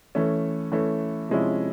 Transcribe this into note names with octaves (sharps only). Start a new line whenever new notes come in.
E3 A3 C#4
E3 A3 C#4
C3 F3 G#3 C#4 E4